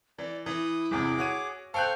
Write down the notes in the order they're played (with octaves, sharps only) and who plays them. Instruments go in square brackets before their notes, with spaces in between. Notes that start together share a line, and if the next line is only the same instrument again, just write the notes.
[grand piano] E3 [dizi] D5
[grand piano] E3 [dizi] E4 [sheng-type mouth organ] D#6
[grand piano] G1 E2 C3 [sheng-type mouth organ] G#4 D6
[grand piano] F#4 C#5 D#7
[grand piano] A4 G5 F#6 [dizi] C5 [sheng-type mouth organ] F5 C#6 F6